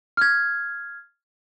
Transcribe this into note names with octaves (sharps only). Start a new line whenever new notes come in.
F6 G#6